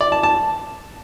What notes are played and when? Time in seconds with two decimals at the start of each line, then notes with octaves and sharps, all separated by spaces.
0.01 D5
0.12 A5
0.23 A5